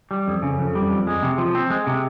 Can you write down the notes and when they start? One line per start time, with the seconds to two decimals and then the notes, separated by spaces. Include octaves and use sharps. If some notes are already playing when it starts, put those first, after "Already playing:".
0.11 G3
0.28 F2
0.42 C#3
0.59 F2
0.75 G3
0.90 F2
1.07 G#3
1.23 C3
1.38 F3
1.55 C4
1.70 G#3
1.87 C3